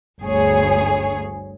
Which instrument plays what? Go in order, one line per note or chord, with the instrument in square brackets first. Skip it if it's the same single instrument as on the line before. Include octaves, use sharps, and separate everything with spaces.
[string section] G1 D2 G#4 C#5